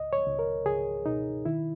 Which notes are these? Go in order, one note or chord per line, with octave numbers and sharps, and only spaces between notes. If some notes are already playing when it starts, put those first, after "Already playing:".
Already playing: C#2 D#5
C#5
C#2
A#4
C#2 G#4
B2 D#4
D#3 E4